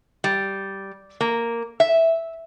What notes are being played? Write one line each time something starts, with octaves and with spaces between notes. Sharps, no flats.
G3
A#3
E5